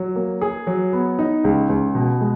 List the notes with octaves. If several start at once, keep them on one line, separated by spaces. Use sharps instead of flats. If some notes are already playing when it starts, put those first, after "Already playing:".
Already playing: F#3
A#3
G#4
F#3
B3
D#4
C#2
C#2
B2
G#3